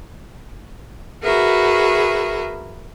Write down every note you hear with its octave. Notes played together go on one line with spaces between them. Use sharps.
F#4 G#4 A#4 B4 E5